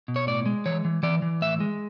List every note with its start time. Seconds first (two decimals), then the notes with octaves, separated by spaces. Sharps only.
0.08 B2
0.16 C#5
0.27 A2 D5
0.46 G#3
0.66 E3 C#5
0.85 E3
1.03 E3 D5
1.22 E3
1.42 A2 E5
1.60 G#3